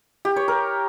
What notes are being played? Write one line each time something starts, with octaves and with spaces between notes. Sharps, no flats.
G4
C#5
A#4